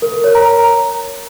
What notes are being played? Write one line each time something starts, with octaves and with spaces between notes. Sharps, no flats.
A#4
A#4
C#5
A#5